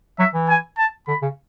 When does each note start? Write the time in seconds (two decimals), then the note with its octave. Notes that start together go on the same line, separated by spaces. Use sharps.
0.19 F#3 E5
0.34 E3
0.49 G#5
0.78 A5
1.08 D3 B5
1.22 C#3